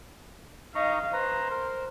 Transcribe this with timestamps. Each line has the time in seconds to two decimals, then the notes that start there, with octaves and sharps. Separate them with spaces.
0.75 D#4 D#5 F5 A#5 C#6
1.13 B4 C5 A#5
1.51 A#4